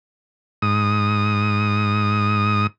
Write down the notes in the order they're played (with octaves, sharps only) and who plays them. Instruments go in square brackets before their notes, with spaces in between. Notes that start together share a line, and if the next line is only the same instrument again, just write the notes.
[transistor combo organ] G#2 D#6